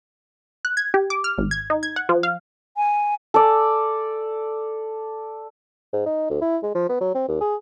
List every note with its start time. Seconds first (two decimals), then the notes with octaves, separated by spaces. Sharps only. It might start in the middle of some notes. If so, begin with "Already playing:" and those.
0.65 F#6
0.77 G#6
0.94 G4
1.10 D6
1.24 F6
1.38 G#1
1.51 G#6
1.70 D#4
1.83 G#6
1.96 F#5
2.09 F3
2.23 F5
2.77 G#5
3.34 A4 D5
5.93 G#2
6.06 D#4
6.30 D2
6.41 E4
6.63 G#3
6.75 F3
6.89 B3
7.01 F#3
7.15 C4
7.28 D#2
7.41 G#4